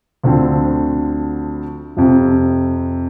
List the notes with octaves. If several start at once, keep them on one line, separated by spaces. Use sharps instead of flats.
D2 D3 F3 C4
F2 C3 F3